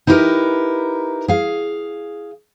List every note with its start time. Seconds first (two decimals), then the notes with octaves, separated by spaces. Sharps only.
0.07 D#4 E4 G4 A#4 B4
1.28 G#4 F5